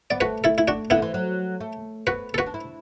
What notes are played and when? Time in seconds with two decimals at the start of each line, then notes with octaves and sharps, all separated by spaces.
0.10 B3 D5
0.21 A3 F#4 B4
0.44 E4 A4
0.58 E4
0.68 D4 F#4
0.90 D3 B3 E4
1.02 E3
1.14 F#3
1.61 A3
2.07 B3 F#4 B4
2.34 A4
2.38 F#4 B4
2.46 D4
2.54 E4